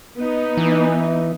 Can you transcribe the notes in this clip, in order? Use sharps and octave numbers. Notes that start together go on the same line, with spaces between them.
B3 D#4
E3